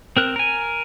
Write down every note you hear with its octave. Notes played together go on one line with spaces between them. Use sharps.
C4 A#4 F#6
A#4 G#5